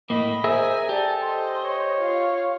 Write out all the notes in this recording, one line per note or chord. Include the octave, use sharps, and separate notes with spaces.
A2 A#3 D#5 B5
G#4 A#4 C5 E5 G#5
G4 A4 D5
C5 D#5 C6
C#5
F4 F5